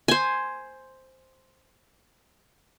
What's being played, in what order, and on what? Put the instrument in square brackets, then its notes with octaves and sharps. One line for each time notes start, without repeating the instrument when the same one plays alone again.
[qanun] C5 G#5